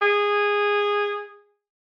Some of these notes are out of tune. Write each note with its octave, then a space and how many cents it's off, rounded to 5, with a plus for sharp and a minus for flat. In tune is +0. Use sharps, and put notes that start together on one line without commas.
G#4 -15